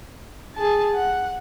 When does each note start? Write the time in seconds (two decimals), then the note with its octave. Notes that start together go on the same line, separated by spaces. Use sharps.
0.55 G#4 A5
0.95 F#5